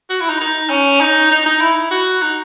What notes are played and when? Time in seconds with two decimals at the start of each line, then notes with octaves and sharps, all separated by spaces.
0.10 F#4
0.20 E4
0.30 D#4
0.40 D#4
0.70 C#4
1.01 D#4
1.31 D#4
1.46 D#4
1.61 E4
1.91 F#4
2.22 D#4